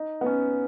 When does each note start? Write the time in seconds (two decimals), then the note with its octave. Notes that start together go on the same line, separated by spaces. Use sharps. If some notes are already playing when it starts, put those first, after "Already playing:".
Already playing: D#4
0.21 B3
0.26 C#4